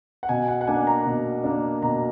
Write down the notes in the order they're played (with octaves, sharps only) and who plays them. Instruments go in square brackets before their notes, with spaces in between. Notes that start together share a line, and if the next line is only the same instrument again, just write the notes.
[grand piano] F#5
B2 G#5
F#5
F#5
A#3 D4 G#5
A#5
B2
A#3 D4
B2 A#5